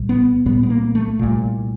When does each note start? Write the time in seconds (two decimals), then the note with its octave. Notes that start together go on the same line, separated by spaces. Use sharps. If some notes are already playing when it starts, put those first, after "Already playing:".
Already playing: C2 A#2
0.09 B3
0.45 C2 A#2 B3
0.63 B3
0.70 A#3
0.95 A3
1.19 C2 A#2